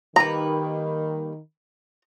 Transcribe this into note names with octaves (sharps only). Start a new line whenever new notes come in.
D#3 G3 A#3 B4 A#5